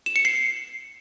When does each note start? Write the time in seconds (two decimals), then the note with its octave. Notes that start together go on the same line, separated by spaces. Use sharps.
0.06 E7
0.16 C#7
0.25 C7